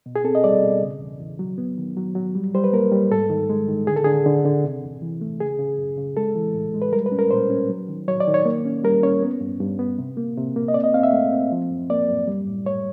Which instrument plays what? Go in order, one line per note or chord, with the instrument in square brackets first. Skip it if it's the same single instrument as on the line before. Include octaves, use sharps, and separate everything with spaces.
[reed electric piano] B2
G#4
C4 A4
D#5
G3 D5
B2
C#3
E2
E2
F#3
B3
D#3
F#3
F#3
G3
G3 C5
B4
A#3 A#4
G3
G#2 A4
D#3
G#3
D#3
D3 G#4
A4
D3 G#4
D3
D3
C3
E2
E3
A3
C#3 G#4
C#3
F#2
C#3
G#3 A4
E3
A2
G#3
B4
G3 A#4
B4
C#4
A#4
A#2 C5
C#4
F#3
D#3
F#3 C#5
D5
D#3
C#5
A#3
C#4
G3 A#4
C#4 C#5
B3
G2
G2
B3
C3
A#3
C3
A#3
D#5
C4 D5
D#5
C4 F5
E5
A3
C4
F3
F#2
A#3 D5
F#2
G3
A2
A2 C#5